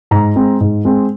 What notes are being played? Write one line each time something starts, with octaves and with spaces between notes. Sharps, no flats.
G#2 A#5
G#3 C4
G#2
G#3 C4